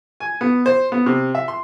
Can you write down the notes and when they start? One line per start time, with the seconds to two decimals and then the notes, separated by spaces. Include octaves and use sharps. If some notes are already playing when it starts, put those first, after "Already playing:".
0.20 G#5
0.41 B3
0.66 C5
0.92 B3
1.06 C3
1.35 E5
1.48 C6